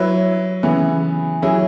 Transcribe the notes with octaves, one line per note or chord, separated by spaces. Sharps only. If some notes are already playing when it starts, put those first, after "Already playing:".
Already playing: F#3 E4 B4
C#3 E3 B3
F#3 E4 G#4